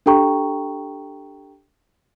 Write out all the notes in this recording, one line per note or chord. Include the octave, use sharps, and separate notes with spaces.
D4 G4 A4 G5 A#5 C#6